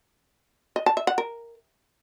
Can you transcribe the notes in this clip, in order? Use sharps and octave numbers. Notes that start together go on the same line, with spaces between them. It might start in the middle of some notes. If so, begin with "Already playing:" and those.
D#5
A5
E5
F#5
A#4